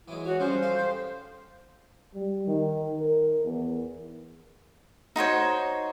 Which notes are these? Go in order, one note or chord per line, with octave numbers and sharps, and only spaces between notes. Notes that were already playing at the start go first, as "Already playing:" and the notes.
E3 F#3 G#3 E4
F#4 C#5
G2 F3 C#4 C5
A4 E5 F5
G4
G3
D#3
A#4
E2
D#4 F#4 C5 C#5